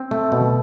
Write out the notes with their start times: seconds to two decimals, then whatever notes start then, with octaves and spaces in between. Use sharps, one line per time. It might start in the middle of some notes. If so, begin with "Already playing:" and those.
Already playing: C4
0.11 A3
0.32 B2